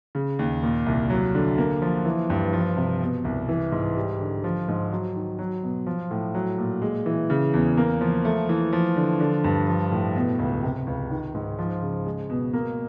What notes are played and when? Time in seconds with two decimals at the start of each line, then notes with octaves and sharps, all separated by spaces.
0.15 C#3
0.39 D#2
0.63 A#2
0.86 C2
1.10 F#3
1.35 D3
1.58 A#3
1.82 F3
2.05 E3
2.30 G2
2.53 F3
2.77 C3
3.01 B2
3.24 C2
3.49 E3
3.72 G#2
3.96 G3
4.20 D3
4.44 F3
4.68 G#2
4.92 F#3
5.16 D#3
5.39 F#3
5.63 B2
5.87 F3
6.11 A2
6.35 F#3
6.58 A#2
6.82 G#3
7.06 E3
7.30 C#3
7.54 E2
7.77 A#3
8.01 F3
8.25 A3
8.49 E3
8.73 F3
8.96 D3
9.20 D3
9.44 G2
9.67 F3
9.92 A2
10.16 B2
10.39 C#2
10.63 C3
10.87 C#2
11.11 D#3
11.35 G#2
11.59 F3
11.82 C#3
12.06 G#3
12.30 B2
12.53 A#3